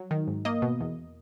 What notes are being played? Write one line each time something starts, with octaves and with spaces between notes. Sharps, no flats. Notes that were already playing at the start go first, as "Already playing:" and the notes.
Already playing: F#3
D#3
G#2
A#3 D#5
B2
E2